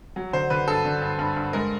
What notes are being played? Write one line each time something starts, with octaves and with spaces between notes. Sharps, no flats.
F#3
D3 C5
D3 B4
G2 A4
D3
G2
G2
G2
G#3 A#4